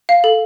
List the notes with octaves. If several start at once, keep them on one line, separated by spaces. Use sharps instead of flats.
F5
A4